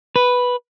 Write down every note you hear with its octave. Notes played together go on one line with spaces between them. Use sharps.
B4